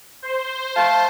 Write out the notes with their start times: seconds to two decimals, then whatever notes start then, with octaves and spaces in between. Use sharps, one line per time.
0.22 C5
0.76 A3 F5 A5